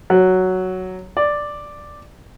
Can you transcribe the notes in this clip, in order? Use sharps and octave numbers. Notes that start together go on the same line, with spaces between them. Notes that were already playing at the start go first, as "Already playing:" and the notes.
F#3
D5